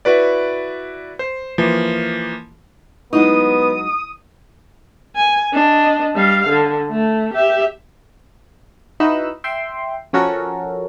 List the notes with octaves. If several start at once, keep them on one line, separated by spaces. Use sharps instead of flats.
E4 F#4 B4 D5
C5
E3 F3 A#3
F#3 G#3 B3 D#4 E4 D#6
G#5
D4 D#5
G3 F5
D3
A3
G4 E5
D#4 E4 F#4 B4 B5 E6
E5 G5 C6
F3 C#4 F#4 A4 A#4